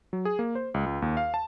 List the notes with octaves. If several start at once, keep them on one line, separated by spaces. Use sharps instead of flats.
F#3
G#4
A#3
C5
C#2
C#2
D#2
F5
A5